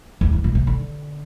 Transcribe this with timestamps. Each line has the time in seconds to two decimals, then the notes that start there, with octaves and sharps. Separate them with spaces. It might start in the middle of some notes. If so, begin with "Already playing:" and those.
0.21 E2
0.33 G2
0.44 A#2
0.55 C3
0.67 D3